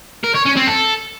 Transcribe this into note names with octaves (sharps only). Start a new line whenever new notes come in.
A#4
C#5
C#4
C4
A4